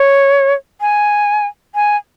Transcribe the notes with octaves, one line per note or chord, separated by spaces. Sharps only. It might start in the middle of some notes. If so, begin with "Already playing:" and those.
Already playing: C#5
G#5
G#5